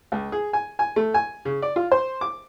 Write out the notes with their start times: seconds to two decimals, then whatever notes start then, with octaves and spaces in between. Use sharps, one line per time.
0.12 C#2
0.32 G#4
0.53 G#5
0.79 G#5
0.96 A3
1.14 G#5
1.45 C#3
1.62 D5
1.76 F4
1.92 C5
2.21 D6